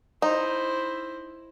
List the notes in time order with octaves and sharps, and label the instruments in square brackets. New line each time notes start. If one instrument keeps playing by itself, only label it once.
[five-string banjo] D#4 [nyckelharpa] E4 C5